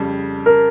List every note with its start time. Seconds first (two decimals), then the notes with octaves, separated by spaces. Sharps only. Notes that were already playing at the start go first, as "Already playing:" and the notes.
Already playing: F2 C#3 G3
0.46 A#4